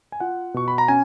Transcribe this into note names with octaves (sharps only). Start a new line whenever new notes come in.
G#5
F4 F#5
B2 C#6
B5
A#5
C#4 G#5